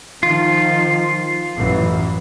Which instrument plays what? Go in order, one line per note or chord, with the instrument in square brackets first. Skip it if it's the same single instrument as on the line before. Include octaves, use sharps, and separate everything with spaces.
[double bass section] D#3 F3 [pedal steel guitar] F4
[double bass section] A1 F#2 E3